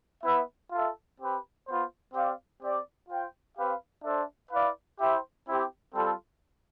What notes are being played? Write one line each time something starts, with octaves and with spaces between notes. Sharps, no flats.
B3 E4 B4 E5
F4 A4 E5
C4 G4 B4
B3 F4 C5
C4 G4 D5 F5
C4 G4 D5
F4 C5 G5
C4 G4 B4 F5
D4 A4 C5 E5
E4 B4 D5 F5
E4 G4 C5 E5 G5
C4 E4 G4
G3 C4 F4 A4